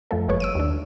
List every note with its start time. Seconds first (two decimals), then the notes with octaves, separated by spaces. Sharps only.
0.11 F#2 F3 A3 A4
0.28 G1 G#3 B4 C#5 C#6
0.40 E6 D7 D#7
0.55 D#2 D4